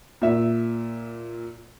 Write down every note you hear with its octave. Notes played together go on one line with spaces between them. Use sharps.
A#2 E5